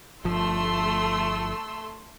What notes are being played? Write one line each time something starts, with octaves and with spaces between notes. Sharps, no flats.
G1 F3 A3 C6 E6